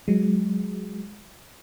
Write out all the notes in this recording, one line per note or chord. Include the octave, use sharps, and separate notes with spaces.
F#3 G#3